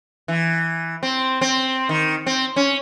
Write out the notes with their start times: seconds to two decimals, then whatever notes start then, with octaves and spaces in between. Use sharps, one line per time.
0.28 E3
1.03 C4
1.41 C4
1.89 D#3
2.27 C4
2.56 C#4